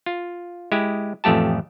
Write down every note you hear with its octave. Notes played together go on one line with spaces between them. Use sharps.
F4
G#3 E4 G4
A1 F2 A3 G4 A5